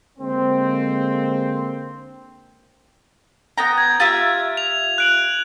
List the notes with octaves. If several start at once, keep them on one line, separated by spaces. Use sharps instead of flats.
D3 G#3 A#3 C4
B3 G5 A#5
G#6
F4 G4 E5
F7
F#6 D7 F#7